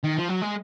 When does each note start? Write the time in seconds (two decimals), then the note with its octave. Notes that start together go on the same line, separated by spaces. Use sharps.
0.04 D#3
0.17 F3
0.29 F#3
0.42 G#3